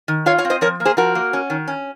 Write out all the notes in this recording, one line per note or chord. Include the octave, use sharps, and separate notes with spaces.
D#3
F4 C#5 F5
C#5 F5
C4
C5 D#5
F3 A#4 C#5
A#3
G#4 C5
F3 F#4 A#4
A#3
C#4
D#3
C#4